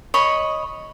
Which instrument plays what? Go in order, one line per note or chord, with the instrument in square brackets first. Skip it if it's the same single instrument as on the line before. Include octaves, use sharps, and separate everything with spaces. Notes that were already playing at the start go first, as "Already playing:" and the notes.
[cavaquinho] C#5 D#5 B5